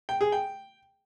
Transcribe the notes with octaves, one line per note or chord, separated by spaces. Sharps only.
G5
G#4
G5